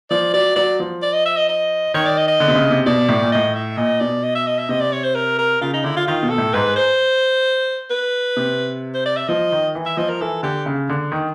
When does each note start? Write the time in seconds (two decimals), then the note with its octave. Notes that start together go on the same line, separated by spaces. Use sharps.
0.11 F3 D5
0.34 F#3 D5
0.56 F#3 D5
0.80 F3
1.02 D5
1.13 D#5
1.25 E5
1.37 D#5
1.49 D#5
1.94 D#3 C#5
2.06 D5
2.18 D#5
2.28 D#5
2.40 D3
2.48 C3
2.55 C#3
2.70 C3
2.86 B2 D5
3.09 A2
3.22 A#2
3.32 A2 D#5
3.55 E5
3.77 A#2 D#5
4.00 B2 D5
4.23 D#5
4.35 E5
4.47 D#5
4.58 E5
4.69 C3 D#5
4.81 D5
4.92 C#5
5.04 C5
5.15 A#4
5.39 A#4
5.61 C#3 F4
5.74 D#4
5.84 D3 E4
5.96 F4
6.07 D#3 F4
6.23 B2
6.30 A4
6.38 A2
6.53 G#2 B4
6.76 C5
7.90 B4
8.37 C3
8.94 C5
9.06 D5
9.17 E5
9.28 F3 D#5
9.52 D#3
9.75 E3
9.86 E5
9.97 F3 D#5
10.09 A#4
10.21 E3 A4
10.43 D3 G4
10.66 C#3
10.89 D3
11.12 D#3